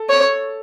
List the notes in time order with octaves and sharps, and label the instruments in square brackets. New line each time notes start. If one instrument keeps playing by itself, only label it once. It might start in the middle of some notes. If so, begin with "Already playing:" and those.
Already playing: [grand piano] A4
[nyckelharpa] C#5